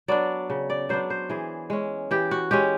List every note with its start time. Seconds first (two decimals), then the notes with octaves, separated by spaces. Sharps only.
0.08 F#3 B3 D4 D5
0.50 C#3
0.70 D5
0.89 F#3 B3 D4 C5
1.10 C5
1.30 E3 G#4
1.70 G#3 C#4
2.11 E3 G4
2.31 F#4
2.51 G#3 C#4 G4